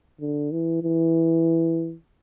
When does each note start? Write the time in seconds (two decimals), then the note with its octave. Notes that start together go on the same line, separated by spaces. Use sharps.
0.21 D3
0.51 E3
0.83 E3